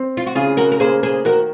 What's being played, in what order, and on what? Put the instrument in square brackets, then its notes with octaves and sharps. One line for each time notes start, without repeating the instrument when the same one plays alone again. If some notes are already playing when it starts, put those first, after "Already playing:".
Already playing: [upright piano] C4
[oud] F4
F#4
[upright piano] C#3 [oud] F4 G#4
[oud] F#4 A#4
A#4
[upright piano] A#3 [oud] G#4 C5
[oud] G#4 C5
[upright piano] D#3 [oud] F#4 A#4